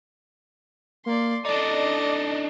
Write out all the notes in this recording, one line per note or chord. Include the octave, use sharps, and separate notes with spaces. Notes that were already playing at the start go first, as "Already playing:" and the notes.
A#3 D5 C6
D4 D#4 A4 D5 D#5